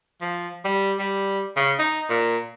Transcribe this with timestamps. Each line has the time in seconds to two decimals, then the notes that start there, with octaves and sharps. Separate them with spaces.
0.21 F3
0.65 G3
0.99 G3
1.57 C#3
1.79 D#4
2.09 A#2